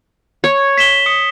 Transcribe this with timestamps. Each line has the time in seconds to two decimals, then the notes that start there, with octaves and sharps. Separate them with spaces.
0.44 C#5
0.77 B6 E7 G7
1.06 D#6 C#7